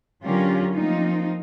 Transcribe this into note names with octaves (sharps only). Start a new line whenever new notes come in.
D3 F#3 C#4 F4 G4 A#4
F3 A3 A#3 C4 D#4 F4